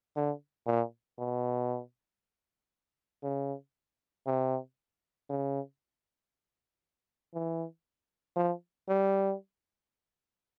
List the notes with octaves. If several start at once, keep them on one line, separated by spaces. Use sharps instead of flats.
D3
A#2
B2
C#3
C3
C#3
E3
F3
G3